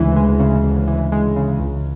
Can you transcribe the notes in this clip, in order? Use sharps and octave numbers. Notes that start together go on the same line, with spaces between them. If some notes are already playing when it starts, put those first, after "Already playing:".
Already playing: D2 C#3 E3 G#3
G#3
C#3
D2
E3
G#3
C#3
C#2